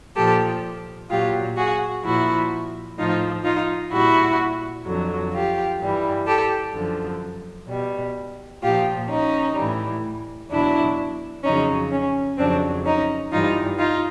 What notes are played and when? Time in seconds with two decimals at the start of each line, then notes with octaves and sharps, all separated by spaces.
0.15 A#2 F3 G4 A4
1.10 A#2 F#3 F4 G4
1.56 F#4 G#4
2.03 A#2 F3 E4 F#4
2.98 A2 F3 D#4 F4
3.44 D#4 F4
3.91 A#2 G3 E4 F#4
4.85 F2 D3 F#3
5.33 F4 G4
5.80 G2 E3 G3
6.26 G4 A4
6.73 F#2 D3 F3
7.68 B2 G3
8.62 A#2 F3 F4 G4
9.08 C#4 D#4
9.56 A2 E3 G3
10.50 E2 B2 F#3 D4 E4
11.43 F2 C#3 F#3 C#4 D#4
11.90 C#4
12.37 F2 C#3 F#3 C4 D4
12.85 C#4 D#4
13.31 G2 E3 G3 D#4 F4
13.78 D#4 F4